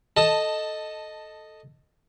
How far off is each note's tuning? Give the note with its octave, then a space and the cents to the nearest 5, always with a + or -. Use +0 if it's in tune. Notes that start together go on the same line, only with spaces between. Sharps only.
A4 +0 D#5 +0 A5 +10